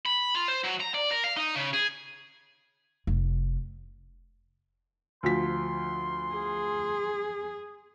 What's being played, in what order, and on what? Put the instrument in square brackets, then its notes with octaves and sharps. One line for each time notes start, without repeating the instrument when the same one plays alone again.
[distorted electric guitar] B5
F4
C5
F#3
A#5
D5
A#4
F5
D#4
C#3
G#4
[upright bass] F1
[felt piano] D2 F3 B6 [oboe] C6
[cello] G#4